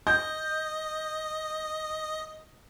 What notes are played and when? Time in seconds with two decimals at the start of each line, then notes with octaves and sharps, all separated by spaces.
0.07 D#5 G6